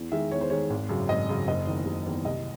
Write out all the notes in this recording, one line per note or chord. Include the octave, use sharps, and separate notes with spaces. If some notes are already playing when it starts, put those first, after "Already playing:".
Already playing: E2
D#3 G#3 E5
E2 C#5
C5
D#3 G#3 C#5
G#1
F#2 C#3
G#1 D#5
F#2 C#3
F#1 D#5
E2 D#3
F#1
E2 D#3
C2 D#5